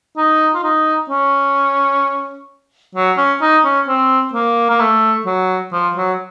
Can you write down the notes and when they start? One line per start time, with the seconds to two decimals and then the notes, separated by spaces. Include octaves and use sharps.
0.17 D#4
0.54 F4
0.63 D#4
1.10 C#4
2.95 F#3
3.17 C#4
3.41 D#4
3.65 C#4
3.88 C4
4.33 A#3
4.70 A#3
4.80 A3
5.26 F#3
5.72 F3
5.96 F#3